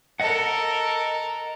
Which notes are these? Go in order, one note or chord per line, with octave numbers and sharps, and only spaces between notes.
A4 A#4 D#5 F#5